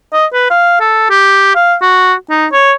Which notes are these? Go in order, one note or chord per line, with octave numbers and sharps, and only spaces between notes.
D#5
B4
F5
A4
G4
F5
F#4
D#4
C#5